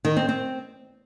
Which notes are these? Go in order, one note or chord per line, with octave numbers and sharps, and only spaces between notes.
D#3
C4
C4